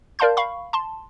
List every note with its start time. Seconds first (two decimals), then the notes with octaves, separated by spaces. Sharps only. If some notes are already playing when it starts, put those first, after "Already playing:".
0.19 A#4 D5 F5 A5 C6 G6
0.37 F5 B5 C#6
0.73 A5 C6